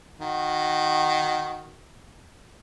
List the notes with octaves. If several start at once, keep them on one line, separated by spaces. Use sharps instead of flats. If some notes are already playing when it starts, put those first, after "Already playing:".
D#3 F#4